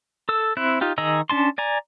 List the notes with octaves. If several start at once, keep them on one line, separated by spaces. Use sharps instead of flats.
A4 E6
C4 E4 F#6
D#4 F4 G4
D#3 G#4 D#5 A#5 E6
C#4 D4 A5 C6
D5 G#5 A#5